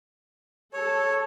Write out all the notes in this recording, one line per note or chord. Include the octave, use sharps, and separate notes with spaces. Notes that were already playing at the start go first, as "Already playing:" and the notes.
A4 C#5